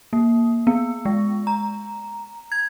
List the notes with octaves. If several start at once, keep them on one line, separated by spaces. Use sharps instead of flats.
A#3
B3
G#3
A#5
G#6